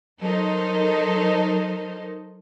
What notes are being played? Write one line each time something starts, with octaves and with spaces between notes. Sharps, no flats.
F#3 D#4 A4 A#4 C5 D#5